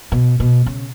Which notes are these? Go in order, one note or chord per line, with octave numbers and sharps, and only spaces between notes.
B2
B2
C#3